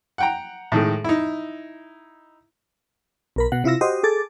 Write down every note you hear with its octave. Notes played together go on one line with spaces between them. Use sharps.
F#5 G5 A#5
A2 D#3 G#3
D#4 E4
B1 A#4 B5
B2 F#5
C3 E4 F4 E6 A#6
F#4 G4 C5 D#5
G#4 A4 D6 A6